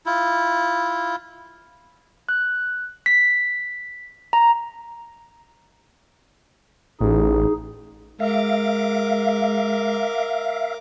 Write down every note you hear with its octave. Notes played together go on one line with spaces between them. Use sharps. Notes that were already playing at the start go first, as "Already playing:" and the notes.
E4 F4
F#6
B6
A#5
A1 D#4 G#4
G#3 A#4 E5 F5 D6